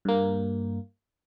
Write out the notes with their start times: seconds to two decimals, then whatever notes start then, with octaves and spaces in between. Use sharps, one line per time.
0.05 G2 A#3